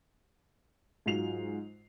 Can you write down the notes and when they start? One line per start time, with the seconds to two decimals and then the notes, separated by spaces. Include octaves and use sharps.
1.06 G#2 F#3 F4 C7 F7